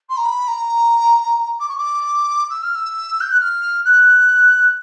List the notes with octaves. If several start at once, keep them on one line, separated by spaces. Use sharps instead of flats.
C6
A#5
B5
A#5
D6
C#6
D6
E6
F6
E6
G6
F#6
F6
F#6